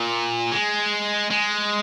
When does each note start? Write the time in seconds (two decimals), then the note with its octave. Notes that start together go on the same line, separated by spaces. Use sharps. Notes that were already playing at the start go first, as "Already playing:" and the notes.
Already playing: A#2
0.52 G#3
1.31 G#3